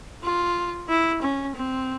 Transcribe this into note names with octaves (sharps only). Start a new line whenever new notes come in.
F4
E4
C#4
C4